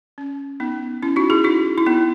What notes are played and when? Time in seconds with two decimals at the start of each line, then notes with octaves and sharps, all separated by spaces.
0.18 C#4
0.60 B3 D#4
1.02 C#4 E4
1.16 D#4 F#4
1.30 E4 G#4
1.44 D#4 F#4
1.78 E4
1.86 B3 D#4